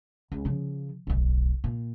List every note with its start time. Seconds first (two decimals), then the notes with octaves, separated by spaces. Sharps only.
0.32 C#2
0.45 C#3 F3
1.07 D1 B1
1.64 A#2